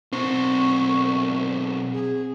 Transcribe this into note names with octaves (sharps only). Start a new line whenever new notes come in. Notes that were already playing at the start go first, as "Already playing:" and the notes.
B1 C4 C5 C#6
G#4